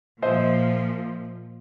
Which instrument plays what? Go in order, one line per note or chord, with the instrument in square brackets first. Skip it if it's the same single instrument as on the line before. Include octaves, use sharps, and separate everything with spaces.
[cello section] A#2 F3 [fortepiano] C5 D#5 E5